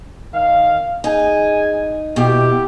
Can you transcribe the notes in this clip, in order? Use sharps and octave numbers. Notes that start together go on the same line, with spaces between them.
D#3 F5
D#4 G#4 G#5
B2 E4 G4